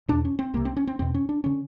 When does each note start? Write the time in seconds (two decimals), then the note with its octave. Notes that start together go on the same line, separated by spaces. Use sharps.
0.08 E2 B2 D4
0.25 C#4
0.39 C4
0.54 C2 C3 A#3
0.65 C4
0.77 C#4
0.87 C4
0.99 E2 B2 C4
1.14 C#4
1.29 D4
1.44 D3 C#4